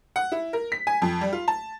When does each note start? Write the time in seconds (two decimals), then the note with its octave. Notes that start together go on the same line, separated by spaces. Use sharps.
0.16 F#5
0.32 E4
0.53 A#4
0.72 B6
0.87 G#5
1.02 F2
1.21 G3
1.33 F4
1.48 A5